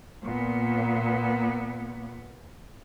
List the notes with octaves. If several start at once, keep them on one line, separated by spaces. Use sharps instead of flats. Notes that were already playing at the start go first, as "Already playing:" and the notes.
A#2 B3